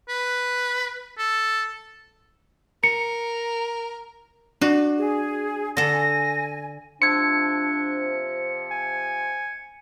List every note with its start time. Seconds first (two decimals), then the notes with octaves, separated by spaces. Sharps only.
0.09 B4
1.18 A4
2.84 A#4 C#7
4.61 D4 F#4
4.98 G#4
5.77 D3 A4 G#5 A#6
7.02 C3 F3 D4 C6 E6 G#6 C#7
8.71 G#5